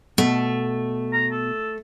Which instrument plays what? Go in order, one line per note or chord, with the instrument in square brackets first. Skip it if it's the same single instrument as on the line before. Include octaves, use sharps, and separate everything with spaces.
[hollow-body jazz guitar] B2 [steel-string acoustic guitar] A3
[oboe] A#5
A4